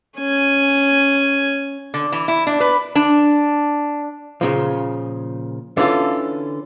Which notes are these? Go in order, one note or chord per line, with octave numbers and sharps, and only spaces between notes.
C#4 G#5
D3
E3
E4
D4
B4
D4
A#2 C#3 F3
D3 E3 C#4 F4 A4